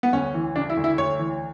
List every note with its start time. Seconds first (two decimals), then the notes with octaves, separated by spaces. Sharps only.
0.03 B3
0.13 D2 C#4
0.34 E3
0.56 C#3 D4
0.70 E4
0.77 D2
0.84 E4
0.98 D2 C#5
1.19 E3